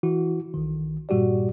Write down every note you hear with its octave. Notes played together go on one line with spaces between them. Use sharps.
E3 E4 F#4
B1 D#3
G2 A#2 G3 F#4 G4 D5